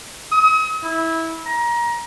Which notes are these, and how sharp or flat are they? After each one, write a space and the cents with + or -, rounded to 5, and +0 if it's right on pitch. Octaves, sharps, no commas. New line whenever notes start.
D#6 +40
E4 -15
A#5 +25